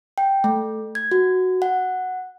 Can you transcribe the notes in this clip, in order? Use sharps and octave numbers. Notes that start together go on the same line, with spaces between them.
G5
A3
G#6
F#4
F#5